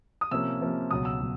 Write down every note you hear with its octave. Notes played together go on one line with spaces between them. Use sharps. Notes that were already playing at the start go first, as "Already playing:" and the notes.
D#6
C3 F3 A#3 C#4 E6
C3 F3 A#3 C#4
C#2 B2 F#3 D#6
E6
B2 F#3